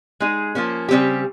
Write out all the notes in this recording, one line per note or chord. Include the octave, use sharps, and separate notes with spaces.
G#3 D#4 G#4
F3 A#3 C#4
C#3 G3 C4 G4